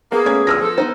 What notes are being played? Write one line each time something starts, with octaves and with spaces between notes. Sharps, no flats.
A#3 B3 G#4
A3 C#4 G#6
D2 G2 F3 E6 F6 A#6
F3 A4
B3 D#4 C5